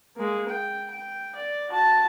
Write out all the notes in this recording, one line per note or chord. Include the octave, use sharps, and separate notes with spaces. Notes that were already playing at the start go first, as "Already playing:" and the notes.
G#3 A#3
G5
G5
D5
F#4 A5